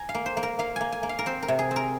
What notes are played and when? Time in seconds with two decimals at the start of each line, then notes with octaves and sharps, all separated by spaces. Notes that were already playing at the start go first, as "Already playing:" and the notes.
Already playing: G#5 A#5
0.09 F5
0.15 A#3
0.26 C5
0.37 A#3
0.43 A#4
0.59 A#3 F5
0.76 A#3 G#5
0.92 G#5
1.03 A#3
1.09 F5
1.19 A#4
1.26 C4 C5
1.42 A#4
1.48 C3
1.59 G#4
1.71 C4
1.76 A#4